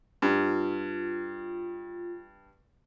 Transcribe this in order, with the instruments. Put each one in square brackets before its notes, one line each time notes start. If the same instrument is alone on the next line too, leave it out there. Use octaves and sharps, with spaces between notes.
[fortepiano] G2 [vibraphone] F4